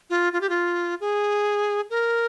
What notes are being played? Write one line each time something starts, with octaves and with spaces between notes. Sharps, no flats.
F4
F4
G4
F4
G#4
A#4